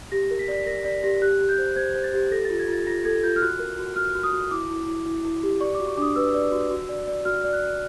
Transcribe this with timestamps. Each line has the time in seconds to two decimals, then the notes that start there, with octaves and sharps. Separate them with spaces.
0.12 G4 A#6
0.31 A#4
0.39 B6
0.48 D5
0.55 B6
0.66 A#4 A#6
0.84 D5 B6
1.04 G4 A#6
1.22 G4 F#6
1.41 G4
1.49 G6
1.58 C5
1.76 C5 G#6
1.95 C5
2.04 A6
2.14 G4
2.31 A4 A#6
2.45 A6
2.50 F4
2.59 G#6
2.68 F4 A6
2.87 F4 A#6
3.05 A4 G#6
3.23 F4 G6
3.36 F6
3.42 F#4 F#6
3.59 A#4
3.79 F#4
3.96 F#4 F6
4.15 F#4
4.23 D#6
4.33 F#4
4.51 E4 D6
4.70 E4
4.87 E4
5.06 E4
5.25 E4
5.43 G4
5.60 D5 C#6
5.75 D6
5.80 F#4
5.88 C#6
5.97 D4 D6 D#6
6.16 B4 E6
6.34 D5
6.52 F#4
6.71 F#4
6.89 D5
7.07 D5
7.25 F#4 F6
7.44 D5
7.53 F#6
7.62 D5